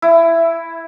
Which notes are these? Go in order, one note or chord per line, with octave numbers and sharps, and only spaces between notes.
E4